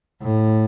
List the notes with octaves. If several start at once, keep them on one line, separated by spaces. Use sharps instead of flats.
A2